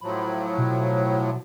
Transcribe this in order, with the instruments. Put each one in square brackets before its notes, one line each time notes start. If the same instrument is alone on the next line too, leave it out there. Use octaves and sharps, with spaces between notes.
[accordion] A2 F3 F#3 [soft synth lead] B5
[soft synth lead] B2